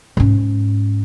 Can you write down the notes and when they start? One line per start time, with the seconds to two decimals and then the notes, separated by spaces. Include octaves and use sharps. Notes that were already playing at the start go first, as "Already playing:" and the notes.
0.17 G#2 C#4